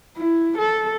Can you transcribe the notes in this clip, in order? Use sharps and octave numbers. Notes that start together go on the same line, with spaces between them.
E4
A4